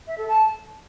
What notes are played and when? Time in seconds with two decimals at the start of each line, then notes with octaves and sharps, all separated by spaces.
0.07 E5
0.18 A4
0.28 A5